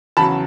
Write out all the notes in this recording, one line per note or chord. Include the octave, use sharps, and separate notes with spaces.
E2 C#3 F#3 A5 B5